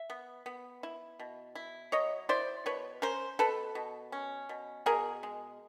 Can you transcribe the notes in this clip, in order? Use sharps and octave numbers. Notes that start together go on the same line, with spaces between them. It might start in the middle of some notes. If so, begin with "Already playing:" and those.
Already playing: E5
B3
B3
E4
B2
E4
F#3 C#5 D#5
E4 C5 D5
B2 B4 C#5
C#4 A#4 C5
B2 A4 B4
B2
C#4
B2
B2 G#4 A#4
G#3